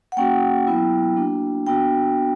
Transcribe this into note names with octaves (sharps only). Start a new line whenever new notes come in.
F#5
A#3 C#4 F#4 G5
F#3 B3 E4
A#3 D4 F#4
B3 D4 F#4 G5